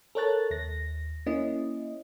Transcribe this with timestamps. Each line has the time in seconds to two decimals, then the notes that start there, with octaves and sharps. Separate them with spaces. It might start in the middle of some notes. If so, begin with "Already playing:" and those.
0.15 A4 A#4 C#5 A5 F#6 A6
0.50 D#2 A#6
1.26 A#3 C#4 E4 D#5